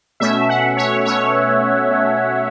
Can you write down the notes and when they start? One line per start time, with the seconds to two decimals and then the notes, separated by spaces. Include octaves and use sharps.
0.20 B2 A3 C#4 E5
0.49 F#5
0.77 C#5
1.05 B2 A3 C#4 C#5
1.90 B2 A3 C#4